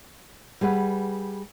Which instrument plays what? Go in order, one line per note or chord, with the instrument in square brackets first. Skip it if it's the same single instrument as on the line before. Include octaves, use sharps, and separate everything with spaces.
[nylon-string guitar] G3 G#4 B4 F#5